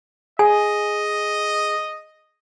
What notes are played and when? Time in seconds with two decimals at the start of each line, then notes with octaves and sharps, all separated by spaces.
0.39 G#4 D#5 G#5